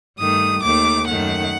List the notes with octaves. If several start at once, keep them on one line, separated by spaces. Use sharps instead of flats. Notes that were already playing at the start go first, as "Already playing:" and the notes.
G2 D#3 A3 D#6
D#2 D#3 A3 D6
F#2 D#3 A3 F#5